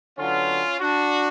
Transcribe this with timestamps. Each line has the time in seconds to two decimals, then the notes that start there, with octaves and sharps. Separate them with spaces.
0.18 D3 F#3 B3 C#4 F4
0.80 D4 F#4